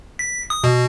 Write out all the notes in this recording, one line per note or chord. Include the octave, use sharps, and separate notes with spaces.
B6
D#6
B2